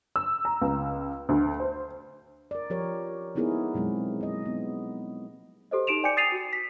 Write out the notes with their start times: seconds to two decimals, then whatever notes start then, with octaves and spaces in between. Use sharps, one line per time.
0.16 E6
0.45 A#5
0.62 C#2
1.29 D2
1.60 C5
2.51 A#4 D5
2.70 F3 G4 A#4 C#5
3.35 A#3 B3 D#4 E4 G#4 A#4
3.74 B2 F#3 G#3 C4
4.21 A#3 D#5
4.43 B3 D#4
5.71 G4 A4 C5 D#5
5.87 D#4 G4 D7 E7 F7
6.03 D5 G5 G#5 D6 G6 C#7
6.17 D#6 A6 C7 D#7 F7
6.32 F#4
6.53 B6